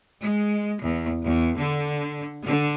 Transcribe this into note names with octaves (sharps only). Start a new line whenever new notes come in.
G#3
E2
E2
D3
D3